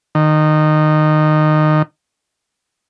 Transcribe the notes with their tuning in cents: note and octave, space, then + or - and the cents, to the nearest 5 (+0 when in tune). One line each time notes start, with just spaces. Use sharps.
D#3 -20